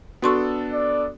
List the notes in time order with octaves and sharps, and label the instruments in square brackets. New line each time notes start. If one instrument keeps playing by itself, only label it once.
[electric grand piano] B3 D4 A4 [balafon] F#4 C6 C#6
[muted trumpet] D5